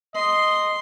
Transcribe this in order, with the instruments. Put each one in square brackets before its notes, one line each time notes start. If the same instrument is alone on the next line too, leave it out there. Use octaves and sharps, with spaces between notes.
[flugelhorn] D#5 [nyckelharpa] C6